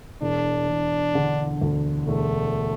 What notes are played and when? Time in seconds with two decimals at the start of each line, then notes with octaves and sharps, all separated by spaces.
0.22 E1 D4
0.69 E1
1.15 D3
1.61 D2
2.07 E1 A3